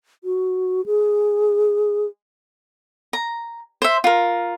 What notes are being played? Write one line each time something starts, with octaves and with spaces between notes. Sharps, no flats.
F#4
G#4
A#5
C5 E5
F4 A#4